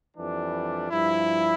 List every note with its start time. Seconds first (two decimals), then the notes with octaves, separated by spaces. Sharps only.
0.16 F2 E3 G3 D4
0.91 G2 F3 E4